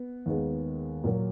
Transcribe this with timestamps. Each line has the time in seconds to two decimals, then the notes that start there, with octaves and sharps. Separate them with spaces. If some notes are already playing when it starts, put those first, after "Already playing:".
Already playing: B3
0.26 D#2 D#3 G#3 B3
1.04 A#2 F#3 A#3